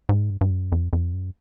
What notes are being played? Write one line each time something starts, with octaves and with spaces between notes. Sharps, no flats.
G#2
G2
G2
F#2
F2
F2
F#2